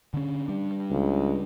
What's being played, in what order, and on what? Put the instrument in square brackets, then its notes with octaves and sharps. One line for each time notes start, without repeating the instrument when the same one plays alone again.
[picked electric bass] D3 C#4
G3 D4
[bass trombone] C#2